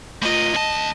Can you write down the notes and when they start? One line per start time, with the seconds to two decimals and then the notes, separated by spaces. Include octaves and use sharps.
0.22 A3 F4 D#5
0.54 D2 A5